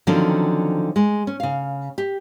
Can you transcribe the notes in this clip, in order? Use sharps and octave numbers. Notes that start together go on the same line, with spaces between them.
D3 D#3 F3 F#3 C4 C#4
G#3
C#4
C#3 F5
G4